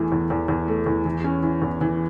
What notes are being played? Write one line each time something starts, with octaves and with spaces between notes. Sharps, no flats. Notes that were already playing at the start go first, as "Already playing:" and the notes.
Already playing: E2 E3 A3
E2
E2
E2
A3
E2
E3
C#4
E3
E2
E3